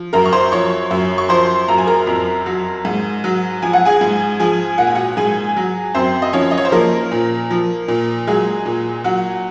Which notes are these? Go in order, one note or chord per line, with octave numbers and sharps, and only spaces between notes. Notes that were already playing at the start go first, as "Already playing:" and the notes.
Already playing: F3
F#2 A#4 A#5
C#6
C5 C6
F3 C#5 C#6
F#2
C#6
F3 C5 C6
F#2 A#5
G#5
A#4 A#5
F2
F#3
G#2
F#3
F3 G#5
F#5
G#4 G#5
G#2
F3 G#4 G#5
A#2 F#5
G#5
F#4 F#5
G#2 G#4 G#5
F#3
F#2 C4 C5
D#5
F3 C#4 C#5
D#5
C#5
C5
F3 A#3 A#4
A#2
F3
A#2
F#3 G#3 G#4
A#2
F#3 F#4